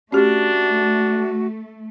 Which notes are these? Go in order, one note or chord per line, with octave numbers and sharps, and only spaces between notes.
A3 C#4 D4 F#4 G4